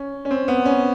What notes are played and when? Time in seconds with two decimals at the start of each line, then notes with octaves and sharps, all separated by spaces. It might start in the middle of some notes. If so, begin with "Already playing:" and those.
Already playing: C#4
0.25 C#4
0.31 C4
0.48 B3
0.65 C#4